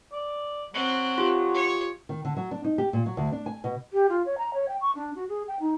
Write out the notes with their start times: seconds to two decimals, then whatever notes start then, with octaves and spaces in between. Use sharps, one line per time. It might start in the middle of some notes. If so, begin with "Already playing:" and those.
0.12 D5
0.74 F#3 C4 F#6
1.18 F4 G4
1.54 C#5
2.09 D#3
2.25 D3
2.37 F#3
2.51 D4
2.65 D#4
2.78 G4
2.93 A#2
3.06 F#3
3.17 D2
3.32 D4
3.46 G#5
3.64 B2
3.93 G4
4.09 F4
4.26 C#5
4.38 A#5
4.54 C#5
4.68 G5
4.81 C#6
4.96 D4
5.16 F#4
5.29 G#4
5.48 G5
5.60 D#4